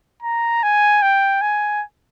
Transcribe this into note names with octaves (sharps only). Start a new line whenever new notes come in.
A#5
G#5
G5
G#5